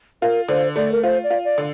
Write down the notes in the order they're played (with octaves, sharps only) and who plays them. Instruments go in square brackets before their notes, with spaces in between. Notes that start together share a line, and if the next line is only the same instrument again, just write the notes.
[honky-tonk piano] F4 [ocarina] A#4
[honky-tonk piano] D3 [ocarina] C5
[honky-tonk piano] A3 [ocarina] D5
[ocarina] A#4
[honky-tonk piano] F4 [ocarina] C5
[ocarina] D5
[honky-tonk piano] F4
[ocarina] D5
[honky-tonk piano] D3